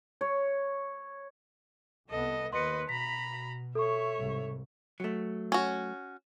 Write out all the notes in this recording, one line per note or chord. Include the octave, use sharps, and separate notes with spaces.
C#5
C2 B3 A4 D#5
D#2 B4 D#5 C6 C#7
B2 A#5 B5 B6
A4 C#5 E5 C#6
C2 G#2
F#3 A3
C#4 F#4